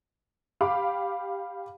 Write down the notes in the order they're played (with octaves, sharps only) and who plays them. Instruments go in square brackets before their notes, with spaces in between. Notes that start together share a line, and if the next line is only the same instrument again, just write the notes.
[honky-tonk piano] G4 F5 B5 D6